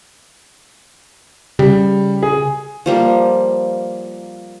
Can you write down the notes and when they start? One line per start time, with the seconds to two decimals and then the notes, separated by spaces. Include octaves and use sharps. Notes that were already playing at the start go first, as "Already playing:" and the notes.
1.59 C#3 G3
2.23 G#4
2.86 F3 G3 A#3